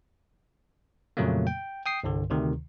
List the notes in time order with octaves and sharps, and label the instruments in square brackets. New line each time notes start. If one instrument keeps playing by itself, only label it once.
[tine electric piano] F2 A#2 C#3 F#3 A3 A#3
G5
G5 D#6 C7
C2 G2 D3
D2 C3 D#3